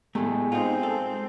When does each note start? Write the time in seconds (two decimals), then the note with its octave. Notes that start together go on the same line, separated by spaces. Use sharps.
0.15 A2 G#3 A3 B3 G4 G#4
0.52 C4 D#4 F4
0.83 A4